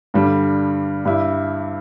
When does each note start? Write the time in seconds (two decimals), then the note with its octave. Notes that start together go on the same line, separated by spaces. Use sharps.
0.14 G2 D3 G3 D4
1.05 G2 G3 E4